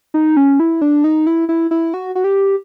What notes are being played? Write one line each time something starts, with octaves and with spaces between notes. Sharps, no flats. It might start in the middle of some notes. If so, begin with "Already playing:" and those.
D#4
C#4
E4
D4
D#4
E4
E4
E4
F#4
F#4
G4